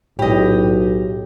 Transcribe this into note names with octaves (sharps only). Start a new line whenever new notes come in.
B1 A2 G4 D#5